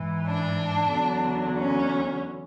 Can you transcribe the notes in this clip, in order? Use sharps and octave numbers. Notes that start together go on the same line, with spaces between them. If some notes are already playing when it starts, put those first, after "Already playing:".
Already playing: G#2 E3
D4
E2 D3 F#3
C#4